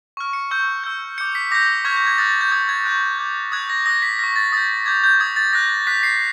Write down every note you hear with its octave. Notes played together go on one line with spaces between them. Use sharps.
C#6 F6
C#7
C#6 E6 G6
C#6 E6 G6
D6 G6 C#7
B6
D6 G6 A#6
C#6 F6 G#6
G6
G#6
D#6 F#6 A6
A6
G6
D#6 G6 G#6
G#6
C#6 F#6
D6 G6
D#6 F#6 G#6
A#6
D#6 F#6 A#6
B6
C#6 F6 A#6
A6
D#6 G6 A6
D6 G6 G#6
G6
D#6 G6 G#6
A6
D#6 F#6 A#6
D6 F#6 B6
C7